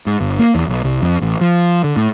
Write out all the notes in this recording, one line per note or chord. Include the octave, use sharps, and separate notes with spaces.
G#2
G1
A#3
E2
B1
C2
F2
A1
F3
D3
A2